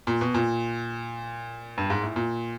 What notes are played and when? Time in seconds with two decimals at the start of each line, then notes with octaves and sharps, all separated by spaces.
0.07 A#2
0.21 B2
0.34 A#2
1.78 G2
1.90 G#2
2.03 A2
2.16 A#2